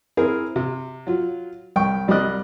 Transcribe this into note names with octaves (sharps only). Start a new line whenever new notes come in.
C4 E4 G#4 A#4
C3
F#3 F4
C2 G5 C#6
C2 G3 C4 D5 D#5 F#6